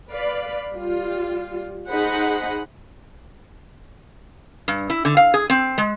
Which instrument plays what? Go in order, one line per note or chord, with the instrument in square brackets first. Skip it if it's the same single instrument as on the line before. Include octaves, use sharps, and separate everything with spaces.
[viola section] B4 D5 F5 B5
G3 F4
D#4 G#4 C5 D#5 F#5 B5
[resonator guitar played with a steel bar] G2
E4
D3
F5
G#4
C4
G#3